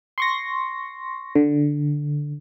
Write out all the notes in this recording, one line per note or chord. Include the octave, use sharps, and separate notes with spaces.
C6 C#6 A#6
D3